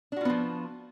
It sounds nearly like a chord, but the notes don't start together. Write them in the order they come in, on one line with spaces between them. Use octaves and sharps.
D4 F#4 F4 B3 F3